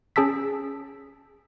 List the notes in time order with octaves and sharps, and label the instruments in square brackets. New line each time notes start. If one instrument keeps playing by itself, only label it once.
[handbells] C#4 G#4 A5 E6 B6